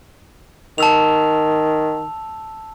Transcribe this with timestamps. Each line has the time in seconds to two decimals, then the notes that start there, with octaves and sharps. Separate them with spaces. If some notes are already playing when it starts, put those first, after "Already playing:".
0.78 D#3 A5 E6 F7